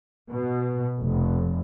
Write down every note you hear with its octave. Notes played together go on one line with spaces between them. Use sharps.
B2
F1